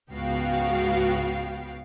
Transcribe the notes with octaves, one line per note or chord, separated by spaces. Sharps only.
C#2 G#2 B3 F#4 F5 G5